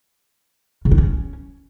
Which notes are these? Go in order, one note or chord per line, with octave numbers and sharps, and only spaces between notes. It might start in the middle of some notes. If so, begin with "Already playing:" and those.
C#3
D4
C#4